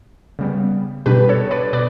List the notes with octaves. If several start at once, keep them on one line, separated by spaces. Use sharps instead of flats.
C#3 G3 B3
B2 G3 D4 G4 B4
A4 C#5
B4 D5
B2 B4 D5